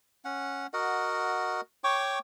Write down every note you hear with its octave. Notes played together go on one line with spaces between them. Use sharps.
C#4 F#5
F#4 A#4 D#5 F#5
C#5 G5 C#6 D6